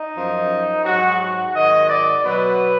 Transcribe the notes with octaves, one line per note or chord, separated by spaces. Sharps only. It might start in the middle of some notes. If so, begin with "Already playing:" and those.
Already playing: D#4
F#2 F3
G#2 F#3 F#4
F#4
G#2 D#3 F#3 D#5
D5
B2 F#3 B4